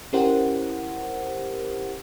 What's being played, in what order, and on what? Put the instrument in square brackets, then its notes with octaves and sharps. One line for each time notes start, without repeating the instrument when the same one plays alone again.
[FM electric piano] C#4 E4 G4 A#4 C5 F#5